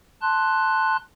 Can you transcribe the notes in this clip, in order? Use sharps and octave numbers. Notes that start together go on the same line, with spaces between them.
A5 C6 F#6